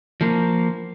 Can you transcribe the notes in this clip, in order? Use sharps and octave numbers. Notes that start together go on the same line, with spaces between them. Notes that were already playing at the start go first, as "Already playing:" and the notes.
F3 A#3